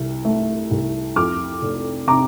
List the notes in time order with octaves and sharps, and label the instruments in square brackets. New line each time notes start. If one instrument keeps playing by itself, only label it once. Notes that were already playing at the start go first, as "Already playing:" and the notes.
Already playing: [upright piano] C2
A3
C2
F2 D6 F6
F1
C3 A#5 D6